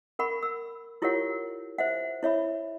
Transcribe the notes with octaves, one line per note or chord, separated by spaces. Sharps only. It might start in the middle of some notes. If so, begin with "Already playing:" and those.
A#4 F#5 B5 C#6
E6
E4 F4 G4 A#4 C#5 F#5
C5 E5 F#5
E4 C#5 E5 B5